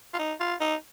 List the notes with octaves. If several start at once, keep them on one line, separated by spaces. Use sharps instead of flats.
F4
D#4
F4
D#4